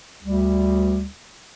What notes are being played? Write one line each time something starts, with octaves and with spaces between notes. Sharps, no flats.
D2 G3